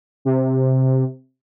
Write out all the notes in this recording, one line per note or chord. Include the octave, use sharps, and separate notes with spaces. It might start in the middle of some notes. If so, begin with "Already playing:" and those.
C3